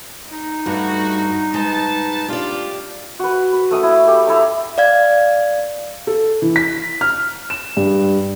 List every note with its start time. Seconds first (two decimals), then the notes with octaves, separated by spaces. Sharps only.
0.30 D#4
0.66 G2 G3 A3 F#4
1.54 G#2 G#3 B4 A5
2.28 D4 F4 G4 D5
3.19 F#4 B4
3.53 B4
3.71 A3 C#4 D#5 D#6
3.83 C#4 E4
4.07 G4 A4
4.27 E4 A4 D#5 A#5
4.78 D5 F5 G#6
6.07 A4
6.42 E3
6.56 B6
7.01 F6
7.50 E7
7.77 G2